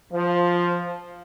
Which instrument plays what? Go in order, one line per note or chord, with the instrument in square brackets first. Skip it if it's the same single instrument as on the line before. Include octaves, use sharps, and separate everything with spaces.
[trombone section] F3